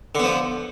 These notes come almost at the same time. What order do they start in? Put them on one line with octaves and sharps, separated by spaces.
D3 B3 F3